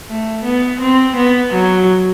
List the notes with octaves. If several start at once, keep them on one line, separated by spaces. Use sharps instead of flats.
A3
B3
C4
B3
F#3